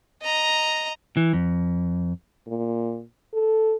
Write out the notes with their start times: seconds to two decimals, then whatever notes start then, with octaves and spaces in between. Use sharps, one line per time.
0.22 D#5 A#5
1.17 E3
1.33 F2
2.48 A#2
3.33 A4